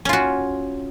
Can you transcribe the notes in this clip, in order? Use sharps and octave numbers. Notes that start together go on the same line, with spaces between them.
C#4 F4 F#4